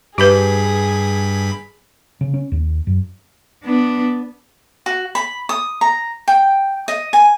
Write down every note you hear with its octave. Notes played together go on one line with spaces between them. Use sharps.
G2 G4 G#4 B4 B5
C#3
C#4
D#2
F#2
B3 D4
F#4
B5
D#6
A#5
G5
D#5
G#5